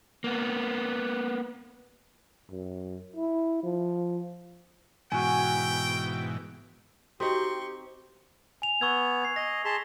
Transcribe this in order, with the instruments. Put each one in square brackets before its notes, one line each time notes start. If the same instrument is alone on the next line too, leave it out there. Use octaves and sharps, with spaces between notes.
[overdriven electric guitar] A#3 B3
[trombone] F#2
E4
F3
[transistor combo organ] G#2 B2 E3 [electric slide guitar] F#4 G#5 [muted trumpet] G5
[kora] C4 D#4 [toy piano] F#4 A4 [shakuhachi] G4 [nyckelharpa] C6 C#6
[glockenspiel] G#5 F7
[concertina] B3 [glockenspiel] C#6 E6 G#6
[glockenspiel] G#6 C7
[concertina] D#5 [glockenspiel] A#6
[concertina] G#4 A5 C6 [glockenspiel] B6